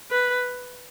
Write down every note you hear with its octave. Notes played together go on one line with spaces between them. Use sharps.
B4